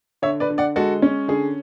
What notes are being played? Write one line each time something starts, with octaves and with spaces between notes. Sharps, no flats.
D3 C#5 E5
B4 D5
D3
D5 F#5
G#3 F#4 A4
C#4
D3 G#4